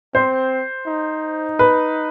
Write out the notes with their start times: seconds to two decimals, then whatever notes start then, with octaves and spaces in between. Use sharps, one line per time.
0.14 C4 C5
0.87 D#4
1.59 B4